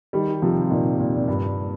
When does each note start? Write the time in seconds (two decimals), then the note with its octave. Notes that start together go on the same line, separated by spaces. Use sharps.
0.13 D#3 G3
0.42 C3 F3
0.70 A#2 D#3
1.00 A#2
1.17 A#2
1.28 G2